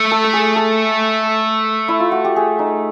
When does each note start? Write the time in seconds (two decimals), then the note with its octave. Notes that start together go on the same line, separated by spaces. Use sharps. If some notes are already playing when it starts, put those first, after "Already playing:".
Already playing: A3
0.11 A4
0.24 A4
0.33 G#4
0.56 A4
1.88 E4
2.00 F4
2.12 F#4
2.25 G4
2.36 G#4
2.59 D#4